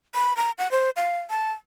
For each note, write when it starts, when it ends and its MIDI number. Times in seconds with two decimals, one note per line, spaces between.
0.15 0.36 83
0.37 0.51 82
0.58 0.70 78
0.71 0.90 72
0.96 1.18 77
1.30 1.52 81